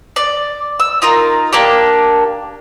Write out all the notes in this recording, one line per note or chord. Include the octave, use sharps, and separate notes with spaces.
D5
E6
D#4 F4 A#4
A#3 D4 G4